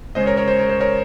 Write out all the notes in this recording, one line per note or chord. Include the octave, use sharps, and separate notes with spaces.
C#3 G#3 C#4 C5 D#5
A#4 C#5
A#4 C#5
C5
A#4
C5
A#4 C#5